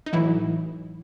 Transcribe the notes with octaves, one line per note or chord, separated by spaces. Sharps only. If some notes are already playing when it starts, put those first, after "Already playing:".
D#4
A2 E3 F#3 E4